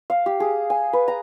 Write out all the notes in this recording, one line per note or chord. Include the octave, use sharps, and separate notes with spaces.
F5
G4
G#4
G#5
B4
A#5